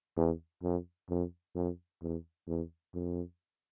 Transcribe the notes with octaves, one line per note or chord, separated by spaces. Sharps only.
E2
F2
F2
F2
E2
E2
F2